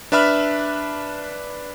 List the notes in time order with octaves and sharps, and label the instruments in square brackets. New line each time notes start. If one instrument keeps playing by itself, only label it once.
[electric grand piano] D4 B4 E5 B5 F6